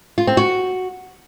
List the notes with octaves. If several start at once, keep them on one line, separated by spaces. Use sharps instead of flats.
F4
C4
F#4